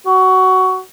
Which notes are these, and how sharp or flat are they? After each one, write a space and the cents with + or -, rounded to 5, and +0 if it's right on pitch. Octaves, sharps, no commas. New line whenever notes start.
F#4 +15